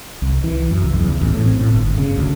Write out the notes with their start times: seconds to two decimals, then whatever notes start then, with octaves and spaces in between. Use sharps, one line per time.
0.22 C2
0.44 E3
0.71 F#2
0.84 C#2
0.99 E2
1.21 A1
1.33 A2
1.46 C4
1.61 A2
1.76 G1
1.98 C#3
2.17 D2